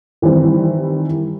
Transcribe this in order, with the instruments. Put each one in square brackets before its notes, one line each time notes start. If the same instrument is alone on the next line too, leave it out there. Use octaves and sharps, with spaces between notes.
[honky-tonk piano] D#3 E3 G3 C4